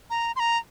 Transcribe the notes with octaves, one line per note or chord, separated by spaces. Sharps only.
A#5
C6
A#5